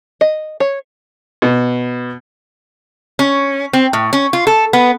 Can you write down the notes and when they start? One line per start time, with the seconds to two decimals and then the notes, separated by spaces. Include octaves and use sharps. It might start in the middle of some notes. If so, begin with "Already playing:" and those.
0.21 D#5
0.60 C#5
1.42 B2
3.19 C#4
3.73 C4
3.93 A2
4.13 C#4
4.33 F4
4.47 A4
4.73 B3